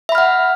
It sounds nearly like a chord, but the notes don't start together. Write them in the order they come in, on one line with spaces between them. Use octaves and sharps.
E5 B5 F6 F#5